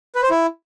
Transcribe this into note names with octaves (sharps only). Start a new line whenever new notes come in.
B4
C5
E4